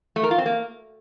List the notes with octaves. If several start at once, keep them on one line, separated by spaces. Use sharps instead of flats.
A3
A#4
F4
C4
A#3